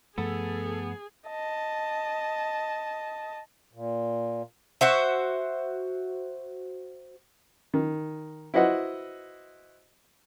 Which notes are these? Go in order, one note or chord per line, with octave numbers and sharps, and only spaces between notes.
G2 F3 A3 B3 G#4 A4
D#5 A5
A#2
F#4 C5 E5
D#3
E4 F#4 B4 C5 D#5 F#5